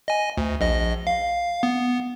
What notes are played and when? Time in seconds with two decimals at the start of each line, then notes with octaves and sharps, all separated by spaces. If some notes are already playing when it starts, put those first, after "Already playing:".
0.08 D#5 G#5
0.37 D2
0.61 A#1 D#5
1.07 F5
1.63 B3